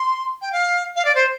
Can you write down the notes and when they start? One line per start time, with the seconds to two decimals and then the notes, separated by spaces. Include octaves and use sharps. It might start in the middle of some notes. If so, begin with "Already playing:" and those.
Already playing: C6
0.42 G5
0.52 F5
0.96 F5
1.05 D5
1.15 C5